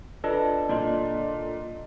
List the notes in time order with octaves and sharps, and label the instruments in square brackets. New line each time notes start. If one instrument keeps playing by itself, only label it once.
[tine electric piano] D4 A4 [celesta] F4 B4 D#5
[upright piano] A#2 [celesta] D5 D#5 C6